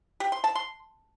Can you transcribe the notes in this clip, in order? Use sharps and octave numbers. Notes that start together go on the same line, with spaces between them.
G4
C6
A5
C6